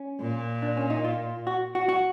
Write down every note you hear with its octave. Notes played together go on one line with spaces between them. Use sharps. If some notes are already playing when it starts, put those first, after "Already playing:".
Already playing: C#4
A#2
D4
C#4
D#4
F4
F#4
F#4
F#4